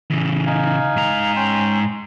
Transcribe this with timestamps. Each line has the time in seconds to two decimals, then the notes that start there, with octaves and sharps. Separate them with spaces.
0.10 C#3 E3
0.46 D#4 F5 G#5
0.96 G#2 A#5
1.36 C#4 G5 C6